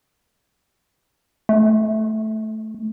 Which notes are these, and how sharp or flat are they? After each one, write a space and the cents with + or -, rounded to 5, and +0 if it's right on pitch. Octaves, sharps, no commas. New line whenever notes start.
A3 -10